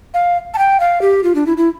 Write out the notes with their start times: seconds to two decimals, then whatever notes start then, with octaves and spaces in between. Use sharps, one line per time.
0.14 F5
0.54 A5
0.58 G5
0.80 F5
1.02 G4
1.24 F4
1.35 D4
1.47 E4
1.57 E4